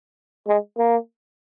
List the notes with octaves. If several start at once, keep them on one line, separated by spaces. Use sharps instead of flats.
G#3
A#3